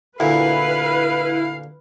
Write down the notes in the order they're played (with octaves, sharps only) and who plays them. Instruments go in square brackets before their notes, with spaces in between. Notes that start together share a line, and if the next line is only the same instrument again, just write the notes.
[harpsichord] D2 A#2 [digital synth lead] E4 [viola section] B4 [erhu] F5